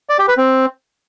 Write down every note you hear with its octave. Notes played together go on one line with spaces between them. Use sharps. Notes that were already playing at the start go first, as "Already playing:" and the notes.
D5
G4
B4
C4